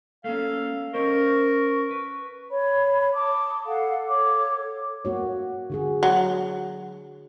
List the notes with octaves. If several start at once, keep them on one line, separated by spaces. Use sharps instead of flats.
A3 A#3 C#4 A4 F5
C#4 A#4 C5 D#5 C#6
B4
C#5 B5
A5 D6 D#6
A4 F5 F#5
A4 C#5 D6
A#3 F#4 C#5
D3 F#4 G#4
F#3